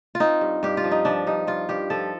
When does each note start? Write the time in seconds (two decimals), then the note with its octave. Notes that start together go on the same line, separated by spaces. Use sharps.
0.15 F4
0.20 C4 D#4
0.41 G2
0.63 G2 G4
0.77 F4
0.84 F3
0.91 D#4
1.05 F3 D4
1.27 G2 D#4
1.47 G2 F4
1.69 G2 G4
1.90 F3 A4